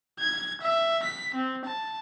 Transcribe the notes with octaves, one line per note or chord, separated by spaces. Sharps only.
G#6
E5
B6
C4
A5